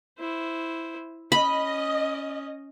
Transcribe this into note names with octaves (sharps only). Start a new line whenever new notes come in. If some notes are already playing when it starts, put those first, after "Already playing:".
E4 C5
C#4 D#5 B5